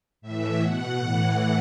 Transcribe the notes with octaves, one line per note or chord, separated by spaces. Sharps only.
A2 E3 E5
B2 F#5
A2 E3